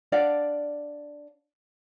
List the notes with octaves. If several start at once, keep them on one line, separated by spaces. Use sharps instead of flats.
D4 D5 F5 F#5